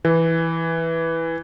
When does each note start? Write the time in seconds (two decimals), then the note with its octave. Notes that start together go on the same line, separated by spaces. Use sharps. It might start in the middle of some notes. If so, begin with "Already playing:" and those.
0.05 E3